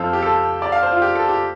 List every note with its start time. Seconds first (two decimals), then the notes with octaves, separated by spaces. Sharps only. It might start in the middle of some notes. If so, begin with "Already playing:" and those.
Already playing: F2 F3 C4 F4 A4
0.13 G4
0.22 A4
0.62 D5
0.72 F5
0.83 C5
0.92 F4
1.02 G4
1.15 A4
1.29 G4